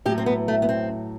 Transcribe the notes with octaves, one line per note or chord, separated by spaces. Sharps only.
A2 F#3 G4
C4
B3
A3
B3
C4